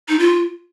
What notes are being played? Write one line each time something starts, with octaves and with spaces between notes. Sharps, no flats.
D#4
F4